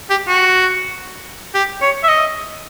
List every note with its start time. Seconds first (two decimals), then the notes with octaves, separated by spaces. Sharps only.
0.10 G4
0.28 F#4
1.55 G4
1.82 C#5
2.04 E5
2.09 D#5